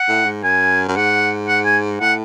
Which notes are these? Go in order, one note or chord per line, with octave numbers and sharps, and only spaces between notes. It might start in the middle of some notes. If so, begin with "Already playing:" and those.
Already playing: F#5
A2
G#2
F#2 G#5
F#2
G#2 F#5
F#5
G#5
A2 F#5